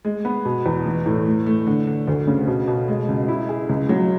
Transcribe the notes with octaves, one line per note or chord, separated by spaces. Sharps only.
G#3
B3
B2
E2
E3
A2
A3
A3
D3
D3
D2
C#3
B2
B2
G#3
C#2
E4
G#4
C#2
F#3